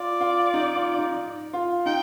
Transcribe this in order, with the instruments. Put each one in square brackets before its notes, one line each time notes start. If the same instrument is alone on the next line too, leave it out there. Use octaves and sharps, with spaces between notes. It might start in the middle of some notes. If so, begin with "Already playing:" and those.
Already playing: [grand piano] F4 [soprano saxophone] D5
[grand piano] F4
D#4
F4
D#4
F4
[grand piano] D#4 [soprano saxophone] G5